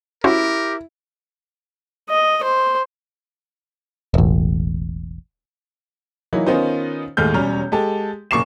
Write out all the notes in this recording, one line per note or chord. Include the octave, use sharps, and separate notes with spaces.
C#4 E4 F#4 G4 A#4 C5
D#5
C5
E1 A1
E3 F#3 A#3 D#4 E4
D#3 B3 C#4 D#4 F4 C5
D#2 A2 G#3 F6 G6
E1 G3 C#4 C#5 A#5 F6
G#3 G4 A4
F#1 A#2 C#6 D6 C7 E7